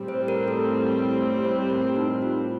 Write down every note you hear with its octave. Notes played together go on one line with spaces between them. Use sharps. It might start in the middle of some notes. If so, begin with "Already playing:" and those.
Already playing: A2 G3 C4
C5
A#4
A4
C5
A#4
D#4
F4